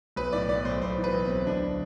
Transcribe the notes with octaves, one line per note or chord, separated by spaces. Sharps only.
B1 B4
A2 D5
B1 D5
B1 C5
B1 C5
E3
B4
B1
C4
B1
D2 D4
D3